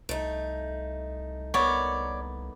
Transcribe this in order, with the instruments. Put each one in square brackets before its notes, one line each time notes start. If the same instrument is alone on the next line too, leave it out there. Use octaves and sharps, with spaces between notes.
[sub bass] C2 [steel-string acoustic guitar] A3 D#4
[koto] A#3 B3 [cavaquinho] C#5 D5